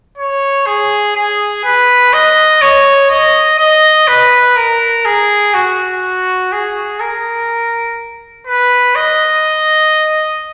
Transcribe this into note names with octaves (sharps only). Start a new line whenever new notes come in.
C#5
G#4
G#4
B4
D#5
C#5
D#5
D#5
B4
A#4
G#4
F#4
G#4
A#4
B4
D#5